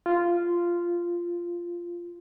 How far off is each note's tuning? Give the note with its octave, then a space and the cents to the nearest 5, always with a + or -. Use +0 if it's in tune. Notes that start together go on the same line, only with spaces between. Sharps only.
F4 -10